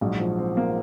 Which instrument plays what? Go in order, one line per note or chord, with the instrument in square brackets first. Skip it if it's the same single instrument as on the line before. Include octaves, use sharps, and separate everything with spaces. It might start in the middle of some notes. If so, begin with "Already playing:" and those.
[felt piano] A#1 G#2 F#3
[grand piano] F3
C4
A#3